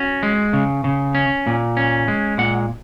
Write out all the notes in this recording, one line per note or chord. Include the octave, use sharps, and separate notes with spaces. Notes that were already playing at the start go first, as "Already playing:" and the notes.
Already playing: C#4 F#4
G#3
C#3
C#3
C#4
A#2
C#4
G#3
A#2 F#5